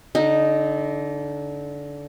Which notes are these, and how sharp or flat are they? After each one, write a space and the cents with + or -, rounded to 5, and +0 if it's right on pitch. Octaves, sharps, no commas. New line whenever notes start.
D3 -25 D#4 +0